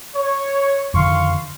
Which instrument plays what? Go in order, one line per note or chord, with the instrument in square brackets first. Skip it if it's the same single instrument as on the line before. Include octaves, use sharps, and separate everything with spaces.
[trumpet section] C#5
[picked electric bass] F2 D3 D#3 [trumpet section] F5 C6 C#6